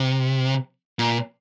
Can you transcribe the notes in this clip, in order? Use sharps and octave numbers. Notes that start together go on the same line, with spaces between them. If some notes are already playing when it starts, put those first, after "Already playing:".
Already playing: C3
A#2